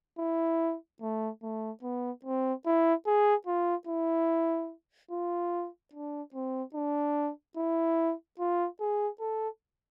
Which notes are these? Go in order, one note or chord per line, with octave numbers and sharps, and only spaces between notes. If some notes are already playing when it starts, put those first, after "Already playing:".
E4
A3
A3
B3
C4
E4
G#4
F4
E4
F4
D4
C4
D4
E4
F4
G#4
A4